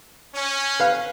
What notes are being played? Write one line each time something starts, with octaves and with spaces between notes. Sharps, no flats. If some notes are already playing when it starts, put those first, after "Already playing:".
C#4
B4 F5